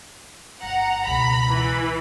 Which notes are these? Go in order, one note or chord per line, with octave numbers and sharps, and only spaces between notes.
G1 F#5 A#5
C#2 B2 B5
E3